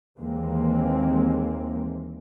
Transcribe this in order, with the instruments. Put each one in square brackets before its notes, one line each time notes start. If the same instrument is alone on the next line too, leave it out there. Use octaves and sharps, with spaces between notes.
[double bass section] D#2 E3 G#3 A#3 C4